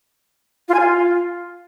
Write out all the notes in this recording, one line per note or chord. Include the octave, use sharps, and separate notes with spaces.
F4
G#5
F4